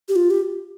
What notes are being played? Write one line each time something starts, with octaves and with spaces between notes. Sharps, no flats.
G4
F4
G4